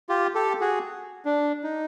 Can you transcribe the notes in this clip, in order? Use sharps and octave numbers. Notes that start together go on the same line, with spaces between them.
F4 G4
G4 A4
F#4 G#4
D4
D#4